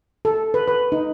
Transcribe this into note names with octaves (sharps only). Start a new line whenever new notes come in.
A4
B4
B4
D#4